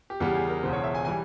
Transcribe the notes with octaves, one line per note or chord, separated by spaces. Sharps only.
G4
E2 C#3 G3 G4
G#4
A#4
E1 E2 C#3 C5
C#5
E5
G#5
E3 G3 G#5